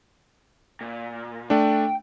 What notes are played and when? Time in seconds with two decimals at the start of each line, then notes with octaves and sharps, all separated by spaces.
0.81 A#2
1.50 A3 D4 G5